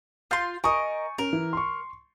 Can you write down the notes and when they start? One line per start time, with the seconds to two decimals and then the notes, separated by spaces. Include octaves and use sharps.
0.31 F4 C6 F6 G6 A6
0.64 A#4 D#5 G#5 C#6 D#6
1.18 C#4 A#4
1.33 E3
1.53 C6 C#6